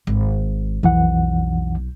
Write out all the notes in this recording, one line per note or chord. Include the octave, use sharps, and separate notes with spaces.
G#1
B1 F2 E3 F#5